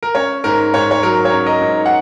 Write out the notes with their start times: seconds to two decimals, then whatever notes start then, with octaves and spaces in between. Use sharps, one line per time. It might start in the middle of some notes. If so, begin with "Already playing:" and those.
0.03 A#4
0.15 C#4 C#5
0.44 G#2 A#4
0.74 G#2 C#5
0.91 C#5
1.03 F#3 A#4
1.25 C#5
1.32 C#4
1.46 A#4 D#5
1.61 G#2
1.86 F#5